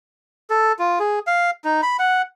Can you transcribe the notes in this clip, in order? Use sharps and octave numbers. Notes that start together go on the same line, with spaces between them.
A4
F4
G#4
F5
D#4
B5
F#5